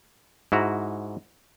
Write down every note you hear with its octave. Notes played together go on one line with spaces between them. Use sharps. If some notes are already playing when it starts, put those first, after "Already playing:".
G#2 E4 F#4 A#5